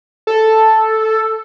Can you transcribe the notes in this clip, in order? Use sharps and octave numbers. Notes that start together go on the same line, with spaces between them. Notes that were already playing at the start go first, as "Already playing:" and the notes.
A4